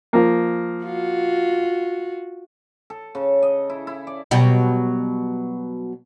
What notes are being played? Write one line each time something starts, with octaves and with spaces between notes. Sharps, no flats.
F3 A#3
F4 F#4
A4
C#3
D#5
E4
E4
D5
B2 F#3 G3